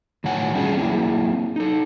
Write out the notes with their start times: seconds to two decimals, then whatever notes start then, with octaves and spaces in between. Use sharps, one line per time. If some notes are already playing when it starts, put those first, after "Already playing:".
0.24 A2 D#3 F#3 C#5 F#5 G#5
0.54 G3 C#4 D4 F4 F#4 G#4
0.77 F#3 A#3 C4 E4 G#4
1.56 D#4 A4